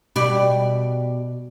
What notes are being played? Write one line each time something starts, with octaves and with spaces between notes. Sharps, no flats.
B2 G3 D5